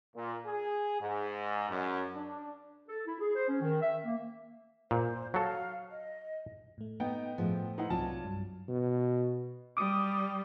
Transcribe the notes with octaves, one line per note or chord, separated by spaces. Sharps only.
A#2
G#4
G#2
F#2
D4
A4
E4
G#4
C5
C#4
D#3
E5
A#3
A#2 C5
F#3 A4 F5
D#5
A2 A3
B3 D#4 G5
A2 F3 F4 G#4 F#5
D#4 E4 B4 F#5 C6
C2 F#3 C4 F4 C#5 D5 A5
G2 F#3
B2
G3 D6 D#6